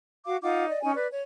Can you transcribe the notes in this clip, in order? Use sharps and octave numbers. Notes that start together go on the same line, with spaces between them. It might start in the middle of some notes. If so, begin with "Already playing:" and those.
F#4 F5 D6
D#4 F4 F#5 D6
D5 D#5
C#4 D#4 G#5
B4 D5
C#5